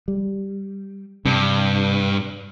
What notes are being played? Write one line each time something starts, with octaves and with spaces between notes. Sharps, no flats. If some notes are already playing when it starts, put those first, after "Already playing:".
G3
G2 C3